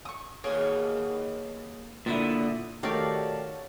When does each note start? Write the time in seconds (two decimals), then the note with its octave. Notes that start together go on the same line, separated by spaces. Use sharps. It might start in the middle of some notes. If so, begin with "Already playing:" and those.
0.05 C#6 D#6
0.44 D#2 B2 A#3 G#4 C#5
2.06 A#2 D3 B3 E4
2.83 D#3 A3 F#4 G4 C#5 D5 F5 A5